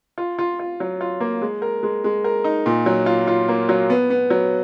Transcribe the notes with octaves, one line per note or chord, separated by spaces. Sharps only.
F4
F4
F4
F#3
F4
A#3
G#3
A#4
G#3
G#3
A#4
D#4
A#2
F#3
F4
F4
A#3
F#3
B3
B3
F#3